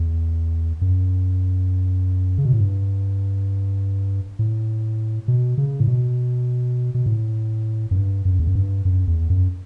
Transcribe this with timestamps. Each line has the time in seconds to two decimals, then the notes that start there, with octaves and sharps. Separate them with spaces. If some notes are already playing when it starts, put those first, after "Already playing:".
Already playing: E2
0.81 F#2
2.38 C#3
2.45 B2
2.53 A2
2.60 G2
4.39 A2
5.28 B2
5.58 C#3
5.80 A2
5.87 B2
6.94 B2
7.06 A2
7.91 F#2
7.95 G2
8.25 F#2
8.39 E2
8.47 F#2
8.55 G2
8.85 F#2
9.07 E2
9.30 F#2